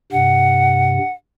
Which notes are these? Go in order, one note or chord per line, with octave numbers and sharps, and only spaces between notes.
G2 C3 F#5